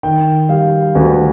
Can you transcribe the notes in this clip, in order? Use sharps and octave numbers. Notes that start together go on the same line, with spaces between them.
D#3 G5
G3 F5
D2 B4